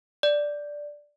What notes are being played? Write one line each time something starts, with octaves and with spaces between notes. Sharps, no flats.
D5